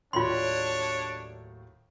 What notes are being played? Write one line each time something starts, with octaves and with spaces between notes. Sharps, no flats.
D#2 A2 F#3 D4 F4 C#5 C6